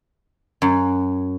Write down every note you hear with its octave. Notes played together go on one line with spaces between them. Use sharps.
F#2